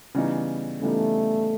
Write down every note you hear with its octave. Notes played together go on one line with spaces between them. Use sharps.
C#3 E3 G3 B3 D#4
C#3 E3 G3 A3 B3 D#4